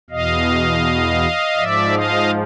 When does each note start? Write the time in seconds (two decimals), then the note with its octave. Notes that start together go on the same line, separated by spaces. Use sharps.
0.10 E2 B2 D#5 F5
1.56 G#2 F3 D5 E5
1.92 D#5 F5